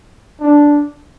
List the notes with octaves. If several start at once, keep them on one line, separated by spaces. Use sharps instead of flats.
D4